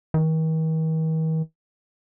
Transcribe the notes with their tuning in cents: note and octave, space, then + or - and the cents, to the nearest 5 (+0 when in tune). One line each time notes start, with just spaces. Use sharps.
D#3 +45